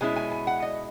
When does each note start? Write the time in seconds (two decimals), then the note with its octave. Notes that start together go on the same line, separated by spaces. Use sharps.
0.01 B2 G#3 C#4 E4 G#5
0.16 G#5
0.32 G#5
0.47 F#5
0.62 D#5